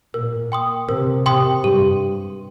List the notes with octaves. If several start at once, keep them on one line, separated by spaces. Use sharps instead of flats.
A#2 A#4
G5 C6 D#6
C3 A#4
C3 G5 C6 D#6
G2 G4